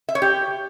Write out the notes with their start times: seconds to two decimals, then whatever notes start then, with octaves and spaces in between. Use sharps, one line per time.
0.09 E5
0.15 C#5
0.22 G4